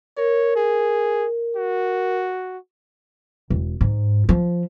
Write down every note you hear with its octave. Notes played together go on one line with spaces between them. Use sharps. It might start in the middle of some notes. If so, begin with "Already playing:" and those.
A#4 C#5
G#4
F#4
E1
G#2
F3